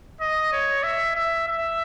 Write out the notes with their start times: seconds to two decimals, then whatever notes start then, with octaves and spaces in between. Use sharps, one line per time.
0.21 D#5
0.52 C#5
0.83 E5
1.15 E5
1.48 E5